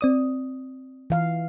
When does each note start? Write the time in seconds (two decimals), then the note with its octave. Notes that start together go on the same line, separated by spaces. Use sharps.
0.01 C4 D5 D#6
1.10 E3 F5